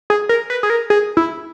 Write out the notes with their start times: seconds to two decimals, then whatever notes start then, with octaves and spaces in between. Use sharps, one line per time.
0.10 G#4
0.29 A#4
0.50 B4
0.63 G#4
0.70 A#4
0.90 G#4
1.17 E4